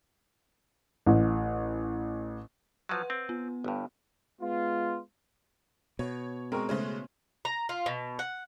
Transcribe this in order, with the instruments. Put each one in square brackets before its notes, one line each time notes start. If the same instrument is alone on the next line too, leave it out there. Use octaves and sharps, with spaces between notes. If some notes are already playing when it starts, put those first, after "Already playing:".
[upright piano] A1
[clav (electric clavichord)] F3 F#3 [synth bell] B4 F#5 C6
[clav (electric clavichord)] C4
[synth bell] B3
[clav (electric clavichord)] G1 G2
[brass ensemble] G#3 B3 F4
[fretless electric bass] B2 [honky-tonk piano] C#5
[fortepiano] G#3 A#4 C#6 [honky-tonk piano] C4
[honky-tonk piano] C#3 G#3 A3 [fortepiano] C#4 C5
[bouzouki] A#5
F4
B2
F#5